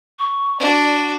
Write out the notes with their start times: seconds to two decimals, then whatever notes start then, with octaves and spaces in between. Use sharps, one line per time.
0.19 C#6
0.60 D4 F#4 D5